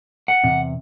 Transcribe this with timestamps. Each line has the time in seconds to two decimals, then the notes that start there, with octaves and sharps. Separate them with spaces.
0.28 F#5
0.44 E2 C3